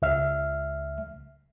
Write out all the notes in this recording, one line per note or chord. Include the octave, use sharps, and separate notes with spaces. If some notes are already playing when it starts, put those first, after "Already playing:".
C#2 E5 F6